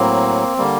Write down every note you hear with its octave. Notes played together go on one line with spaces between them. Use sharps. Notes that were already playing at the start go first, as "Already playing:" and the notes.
Already playing: A2 F#3 A#3 C4
D3 G3 A#3